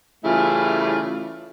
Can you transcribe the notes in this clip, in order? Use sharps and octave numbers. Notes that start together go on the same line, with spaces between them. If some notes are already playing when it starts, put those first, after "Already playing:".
C#3 E3 G3 A3 E4 F4